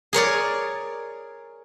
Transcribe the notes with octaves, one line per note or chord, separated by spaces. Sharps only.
G#4 A#4 C#5 D5